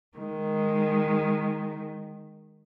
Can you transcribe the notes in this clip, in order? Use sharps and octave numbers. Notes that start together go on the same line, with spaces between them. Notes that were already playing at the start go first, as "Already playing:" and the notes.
D#3 G#3